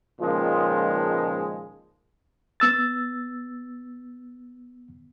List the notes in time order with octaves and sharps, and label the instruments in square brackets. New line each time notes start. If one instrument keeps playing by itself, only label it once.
[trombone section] C#2 A#2 D#3 F3 G#3
[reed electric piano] B3 E6 A6